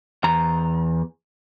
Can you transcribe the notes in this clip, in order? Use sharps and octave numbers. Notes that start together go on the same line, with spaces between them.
E2 A#5